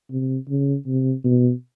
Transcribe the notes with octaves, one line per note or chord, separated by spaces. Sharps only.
C3
C#3
C3
B2